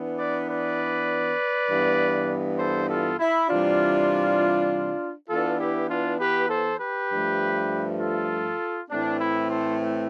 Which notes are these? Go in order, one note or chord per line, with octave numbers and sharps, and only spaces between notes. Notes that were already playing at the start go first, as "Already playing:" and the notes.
Already playing: E3 B3 D4
B4 D5
B4 D5
G2 E3 B3
A4 C5
F4 A4
E4
C3 E3 G3 D4 F4
E3 B3 D4 F4 A4
E4 G4
D4 F4
G4 B4
A4 C5
G4 B4
G2 F3 A3
F4 A4
A2 E3 A3 C4 D4
E4
A4 C5